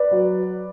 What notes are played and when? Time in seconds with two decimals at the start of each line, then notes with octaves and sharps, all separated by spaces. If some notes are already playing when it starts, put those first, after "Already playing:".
Already playing: B4 D5
0.11 F#3